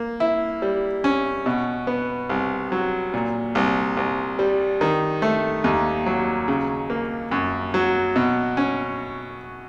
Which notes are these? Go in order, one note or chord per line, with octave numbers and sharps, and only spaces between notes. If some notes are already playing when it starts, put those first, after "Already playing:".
Already playing: A#3
E4
G3
C#4
B2
B3
C2
F#3
A#2
C2
C2
G3
D#3
A3
D#2
F#3
C#3
A#3
F#2
F#3
B2
C#4